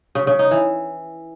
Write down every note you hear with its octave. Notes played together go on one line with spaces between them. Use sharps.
C#3
C#3
D#4
E3